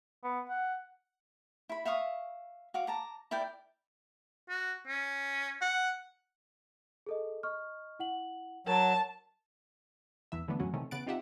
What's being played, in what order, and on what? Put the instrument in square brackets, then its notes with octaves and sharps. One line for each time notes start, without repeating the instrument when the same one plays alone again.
[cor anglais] B3
F#5
[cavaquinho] E4 B5
E5 F5 C#6 D#6
F#4 F5 D6
A5 A#5 D6
E4 A#4 D5 G5
[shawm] F#4
C#4
F#5
[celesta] G#4 A4 D#5
D#5 C#6 F6
E4 F#5 F#7
[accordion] F#3 [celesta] A#4 [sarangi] A5
[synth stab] E2 E3 E5
D3 E3 F#3 A3 B3 D4
F#2 A2 E3 F#3 C#4 F#4
C3 D#3 E3 A3 C4 C#4
E2 C#3 B3 F#6 A6 D7
C4 D#4 F4 G4 E5 F#5